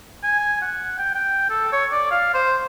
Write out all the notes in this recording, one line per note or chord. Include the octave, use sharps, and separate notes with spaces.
G#5
F#5
G5
G5
A4
C#5
D5
F5
C5